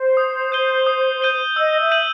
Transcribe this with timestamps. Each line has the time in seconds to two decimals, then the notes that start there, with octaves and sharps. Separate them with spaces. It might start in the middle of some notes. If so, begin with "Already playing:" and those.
Already playing: C5
0.17 D#6
0.52 G6 D#7 G7
0.87 D#6
1.22 G6 D#7 G7
1.56 D#5 E6
1.80 E5
1.91 G6 D#7 F#7